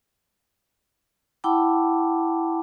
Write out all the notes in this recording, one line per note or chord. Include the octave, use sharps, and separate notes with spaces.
E4 F#5 G5 A5 B5 D6